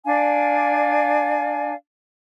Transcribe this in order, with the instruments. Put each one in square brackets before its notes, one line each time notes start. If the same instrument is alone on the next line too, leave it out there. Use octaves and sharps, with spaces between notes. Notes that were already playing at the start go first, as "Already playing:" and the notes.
[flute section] D4 D5 F5 G#5